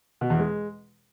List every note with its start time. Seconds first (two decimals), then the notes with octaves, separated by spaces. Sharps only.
0.21 B2
0.30 E2
0.39 G#3